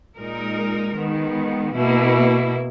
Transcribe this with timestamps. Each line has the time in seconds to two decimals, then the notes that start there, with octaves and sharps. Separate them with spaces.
0.18 A#2 G#3 D#4 A#4
0.96 D#3 G#3 B3
1.75 B2 A#3 E4